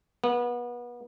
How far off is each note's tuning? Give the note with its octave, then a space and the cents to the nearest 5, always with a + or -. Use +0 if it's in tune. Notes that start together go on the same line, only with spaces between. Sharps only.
B3 -30